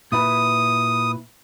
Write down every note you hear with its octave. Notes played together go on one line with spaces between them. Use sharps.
A#2 E4 B4 D#6